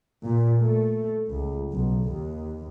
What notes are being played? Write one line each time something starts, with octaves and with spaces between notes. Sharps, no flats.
A#2
A3
C#2
B1
D#2